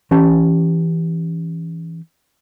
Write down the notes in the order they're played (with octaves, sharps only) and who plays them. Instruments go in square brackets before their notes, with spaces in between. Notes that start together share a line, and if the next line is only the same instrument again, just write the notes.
[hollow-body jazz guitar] E3 C#4 G4 A5